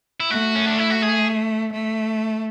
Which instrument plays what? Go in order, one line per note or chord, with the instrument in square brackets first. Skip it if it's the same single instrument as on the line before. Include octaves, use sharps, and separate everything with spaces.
[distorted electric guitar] E4
[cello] A3 [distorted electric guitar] F#4
[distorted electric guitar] C#4
D4
E4
F#4
G#4
[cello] A3